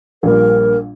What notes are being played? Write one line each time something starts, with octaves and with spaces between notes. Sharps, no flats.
A#1 A#2 G3 A#4